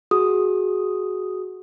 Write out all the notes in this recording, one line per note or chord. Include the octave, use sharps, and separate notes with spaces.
F#4 G#4 D#6